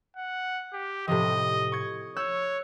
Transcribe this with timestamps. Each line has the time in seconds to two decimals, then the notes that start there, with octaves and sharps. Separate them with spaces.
0.17 F#5
0.73 G4
1.08 A2 C3 F3 D#5
1.72 C#6 G#6
2.16 C#5 E6 F#6 G6